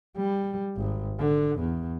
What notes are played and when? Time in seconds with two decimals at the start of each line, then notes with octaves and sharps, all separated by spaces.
0.17 G3
0.77 G#1
1.20 D3
1.60 E2